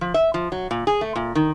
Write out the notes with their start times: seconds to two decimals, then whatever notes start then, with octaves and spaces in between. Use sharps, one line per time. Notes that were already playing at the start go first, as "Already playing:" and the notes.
0.01 F3
0.14 E5
0.34 F3
0.52 F#3
0.71 A#2
0.87 G#4
1.01 A3
1.16 A#2
1.35 D#3